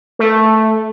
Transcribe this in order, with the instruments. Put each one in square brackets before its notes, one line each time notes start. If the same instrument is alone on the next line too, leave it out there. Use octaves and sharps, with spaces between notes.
[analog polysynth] A3